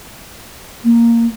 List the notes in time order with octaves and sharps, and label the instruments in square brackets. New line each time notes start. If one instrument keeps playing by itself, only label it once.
[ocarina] A#3